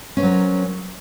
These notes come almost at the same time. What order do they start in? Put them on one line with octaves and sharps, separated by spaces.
C#4 C5 F#3 A#4